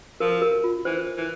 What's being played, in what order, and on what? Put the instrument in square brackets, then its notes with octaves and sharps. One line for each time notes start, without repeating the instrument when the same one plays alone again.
[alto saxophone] F3 [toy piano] A#4
[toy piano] A#4
F4
[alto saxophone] E3 [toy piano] C5
[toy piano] C5
[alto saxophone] E3